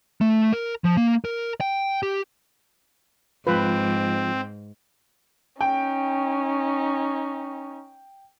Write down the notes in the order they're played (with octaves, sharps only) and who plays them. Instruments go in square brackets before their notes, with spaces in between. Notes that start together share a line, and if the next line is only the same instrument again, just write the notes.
[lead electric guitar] A3
A#4
F3
A#3
A#4
G5
G4
[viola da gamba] G#2 [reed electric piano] F3 G#3 F4 [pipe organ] C4 [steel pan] B4
[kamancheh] C#4 D#4 [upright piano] G5